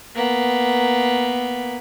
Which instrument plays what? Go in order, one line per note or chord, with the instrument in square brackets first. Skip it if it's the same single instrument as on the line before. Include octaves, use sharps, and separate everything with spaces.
[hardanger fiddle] A#3 B3